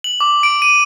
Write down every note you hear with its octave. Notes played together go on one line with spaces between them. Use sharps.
F#7
D6
D7
D#7